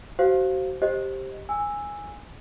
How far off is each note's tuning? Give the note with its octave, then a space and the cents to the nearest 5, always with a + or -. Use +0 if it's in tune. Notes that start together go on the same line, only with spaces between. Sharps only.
F#4 +40 C5 +0 F5 +0
G4 +0 C5 +15 D#5 +0
G#5 -10 E6 +0